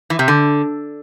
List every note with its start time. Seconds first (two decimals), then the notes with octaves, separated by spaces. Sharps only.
0.10 E3
0.19 C3
0.28 D3